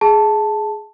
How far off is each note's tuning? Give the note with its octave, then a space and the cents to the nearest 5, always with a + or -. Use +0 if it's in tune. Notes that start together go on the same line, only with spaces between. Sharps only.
G#4 +10 A5 +0